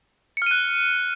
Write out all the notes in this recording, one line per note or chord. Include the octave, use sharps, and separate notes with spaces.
F6 F#6 C#7 D#7